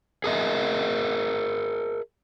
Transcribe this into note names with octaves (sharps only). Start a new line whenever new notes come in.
G#4 A#4 D#5 E5